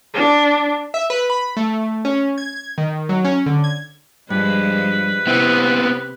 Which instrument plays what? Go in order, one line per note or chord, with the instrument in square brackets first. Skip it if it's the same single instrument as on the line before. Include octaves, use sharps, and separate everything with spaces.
[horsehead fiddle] D4
[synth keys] E5
B4
B5
A3
C#4
G#6
G#6
D#3
F#3
C#4
D3
G#6
[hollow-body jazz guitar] G2 [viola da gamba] F3 G3 G#3 [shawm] B4
[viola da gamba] C3 [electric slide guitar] B3 C4 [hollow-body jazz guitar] E4